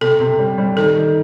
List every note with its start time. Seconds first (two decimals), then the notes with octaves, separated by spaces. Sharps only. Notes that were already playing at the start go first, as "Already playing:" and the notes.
0.01 C3 A4
0.20 C3
0.39 G3
0.58 G3
0.77 D#3 A4
0.96 D#3